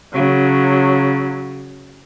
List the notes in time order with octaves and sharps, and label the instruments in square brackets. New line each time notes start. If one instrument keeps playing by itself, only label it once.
[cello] C#3 [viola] F#3